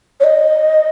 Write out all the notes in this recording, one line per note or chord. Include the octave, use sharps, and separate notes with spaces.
C#5
D#5